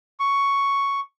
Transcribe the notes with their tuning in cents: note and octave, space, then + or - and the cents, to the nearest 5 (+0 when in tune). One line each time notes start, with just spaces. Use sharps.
C#6 +5